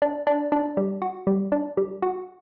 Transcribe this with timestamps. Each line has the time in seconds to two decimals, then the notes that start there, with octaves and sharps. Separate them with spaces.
0.02 D4
0.27 D4
0.52 D4
0.77 G3
1.02 F#4
1.27 G3
1.52 D4
1.77 G3
2.02 F#4